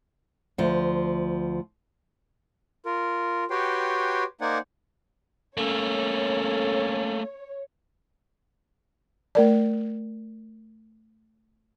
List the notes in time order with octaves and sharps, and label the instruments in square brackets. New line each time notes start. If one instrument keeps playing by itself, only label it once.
[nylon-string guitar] D2 F3
[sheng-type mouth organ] F4 A#4
F#4 G4 B4 C#5 G5 C6
A#3 D#4 C5 D5 F#5 G#5
[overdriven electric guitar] A3 A#3 [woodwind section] C#4 A4 [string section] C#5
[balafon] A3 A#4 D5